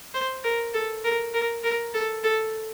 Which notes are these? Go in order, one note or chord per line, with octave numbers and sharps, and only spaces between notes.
C5
A#4
A4
A#4
A#4
A#4
A4
A4